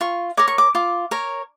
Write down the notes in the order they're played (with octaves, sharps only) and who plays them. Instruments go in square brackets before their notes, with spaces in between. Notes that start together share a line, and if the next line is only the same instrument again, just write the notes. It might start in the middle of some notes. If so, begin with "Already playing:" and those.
[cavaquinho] F4 C#6
A#4 C#5 D6
C#6
D6
F4 D6
A#4 C#5